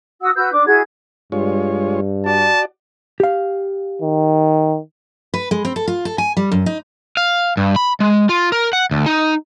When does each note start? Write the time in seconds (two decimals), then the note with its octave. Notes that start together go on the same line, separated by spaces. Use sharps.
0.21 F#4 F#5 D#6 E6
0.35 F#4 B4 E6 G6
0.52 D4 D6
0.66 E4 F#4 G#4 G#6
1.32 G2 G#3 F4 C#5
2.26 F#4 D5 A5
3.20 G4 F5
4.02 D#3
5.34 B4
5.51 G#3
5.65 C4
5.76 A4
5.88 F4
6.05 A4
6.18 G#5
6.37 G3
6.52 F#2
6.66 D#4
7.17 F5
7.57 G2
7.76 B5
8.00 G#3
8.29 F4
8.52 A#4
8.73 F#5
8.91 D2
9.06 D#4